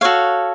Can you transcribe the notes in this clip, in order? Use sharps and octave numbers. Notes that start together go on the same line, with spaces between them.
F#4 A4 C#5 F5